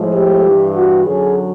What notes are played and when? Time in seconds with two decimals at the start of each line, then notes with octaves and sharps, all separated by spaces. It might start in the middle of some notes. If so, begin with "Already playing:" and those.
Already playing: A2 F3 G#3
0.14 G4
0.44 G2 E3 G3
0.75 F#4
1.04 F#2 D3 F#3 G#4